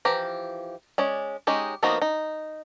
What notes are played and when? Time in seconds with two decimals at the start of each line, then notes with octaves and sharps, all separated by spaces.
0.05 E3 F3 G4 A#5
0.98 G#3 C#4 D5
1.47 G#3 C#4 D#4 G4
1.83 F3 A#3 B3 D#4 F#4
2.02 D#4